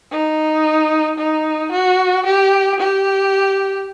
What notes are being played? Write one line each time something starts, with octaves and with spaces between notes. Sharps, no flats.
D#4
D#4
F#4
G4
G4